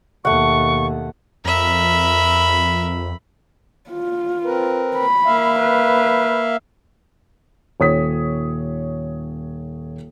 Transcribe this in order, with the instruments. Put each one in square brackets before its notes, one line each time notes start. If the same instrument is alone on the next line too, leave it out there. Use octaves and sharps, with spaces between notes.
[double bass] D#2 B2 [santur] A3 F#5 [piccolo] C#6
[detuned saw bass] F2 [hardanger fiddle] A#4 E5 [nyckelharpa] B5
[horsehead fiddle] F4
[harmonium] C4 A#4 B4
[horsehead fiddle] B5
[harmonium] A#3 E5 F5
[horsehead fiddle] B4
[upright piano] D#1 C#5 D#6 B6